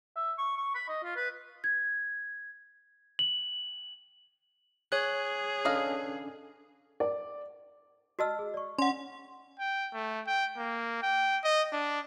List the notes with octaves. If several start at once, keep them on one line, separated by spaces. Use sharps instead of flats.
E5
C#6
C#6
B5
D#5
F4
B4
G#6
F#7
G#4 C#5 F#6
C#4 D4 A4 B4 D#5 F5
D5
F#4 D5 D#5 A5 E6 F6
G#4
D5 C#6
C#4 D5 F#5 C6
G5
A3
G5
A#3
G5
D#5
D4